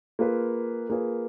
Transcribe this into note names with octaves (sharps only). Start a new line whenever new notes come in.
A#3 F4 G#4 B4
A#3 F4 G#4 B4